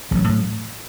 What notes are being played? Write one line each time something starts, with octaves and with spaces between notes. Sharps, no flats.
A1 F#3
A2